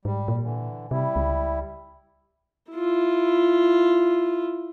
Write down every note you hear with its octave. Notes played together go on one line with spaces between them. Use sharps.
G#2 G3
A#2
D3 E3
C3 G3 E4
C#2
E4 F4